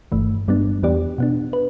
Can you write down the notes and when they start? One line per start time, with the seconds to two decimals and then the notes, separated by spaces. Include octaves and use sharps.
0.12 G1 G2 E3 A3
0.48 G2 G3 B3 D4
0.83 E2 E3 B3 G4 D5
1.18 B2 B3 D4
1.53 B4